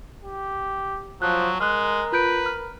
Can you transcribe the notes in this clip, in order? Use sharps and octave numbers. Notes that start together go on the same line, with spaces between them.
G4
F3 F#3 F#6
G#3 A#4 F6 F#6
F4 B4 G6 D7
F6